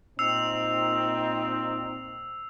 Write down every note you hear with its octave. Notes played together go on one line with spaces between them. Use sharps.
A#2 C4 D#4 E6 C7 F7